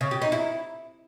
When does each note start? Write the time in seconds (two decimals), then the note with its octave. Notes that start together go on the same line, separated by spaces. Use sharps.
0.01 C#3
0.11 G4
0.22 D#4
0.32 E4